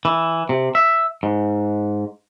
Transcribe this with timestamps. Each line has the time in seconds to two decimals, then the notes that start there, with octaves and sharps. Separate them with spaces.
0.05 E3
0.49 C3
0.75 E5
1.23 G#2